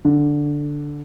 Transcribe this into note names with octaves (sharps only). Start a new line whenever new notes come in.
D3